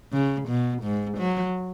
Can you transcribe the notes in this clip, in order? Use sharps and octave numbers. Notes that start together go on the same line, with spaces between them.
C#3
B2
G#2
F#3